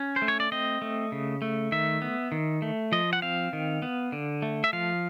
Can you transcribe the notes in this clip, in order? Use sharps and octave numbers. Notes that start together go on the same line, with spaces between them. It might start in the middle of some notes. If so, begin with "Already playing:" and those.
Already playing: C#4
C5
A3
C#5
D5
C4 D#5
A3
C#3
A3
D#3 E5
B3
D#3
A3
F3 D#5
F#5
C4 F5
D#3
B3
D3
A3
E5
F3 F5